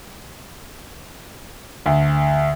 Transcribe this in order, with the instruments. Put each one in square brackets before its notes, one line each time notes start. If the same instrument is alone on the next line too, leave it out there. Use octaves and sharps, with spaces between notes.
[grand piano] D2